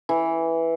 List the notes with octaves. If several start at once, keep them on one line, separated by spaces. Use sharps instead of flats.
E3